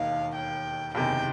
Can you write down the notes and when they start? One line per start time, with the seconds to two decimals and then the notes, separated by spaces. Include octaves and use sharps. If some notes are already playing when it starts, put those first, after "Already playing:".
Already playing: E1 D#2 D#3 F5
0.35 G5
0.94 F#1 E2 C3 D#3 G5